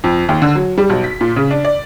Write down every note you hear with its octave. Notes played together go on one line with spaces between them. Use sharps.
F2
D#2
D3
F#3
G3
B1
B6
A#2
C#3
D4
D5